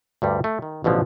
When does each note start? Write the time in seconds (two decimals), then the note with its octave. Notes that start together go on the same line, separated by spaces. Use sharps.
0.22 D2 G2 G3
0.44 A3
0.62 D#3
0.84 A1 B2 D3 F3